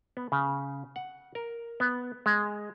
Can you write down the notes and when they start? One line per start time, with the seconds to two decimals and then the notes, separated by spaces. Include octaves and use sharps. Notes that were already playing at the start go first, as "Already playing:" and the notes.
0.17 B3
0.32 C#3
0.96 F#5
1.35 A#4
1.80 B3
2.26 G#3